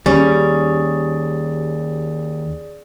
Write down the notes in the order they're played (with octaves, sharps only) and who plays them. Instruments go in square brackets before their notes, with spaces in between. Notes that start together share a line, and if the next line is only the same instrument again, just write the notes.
[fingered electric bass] D#2 [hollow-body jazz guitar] G3 [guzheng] C#4 [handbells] G#4 D5